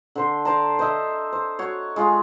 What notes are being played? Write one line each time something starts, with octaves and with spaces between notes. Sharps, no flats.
D3 C5 C6
C5 D5 A5 A#5
C5 D#5 E5
C5
F#4 C#5
G#3 F4 G#4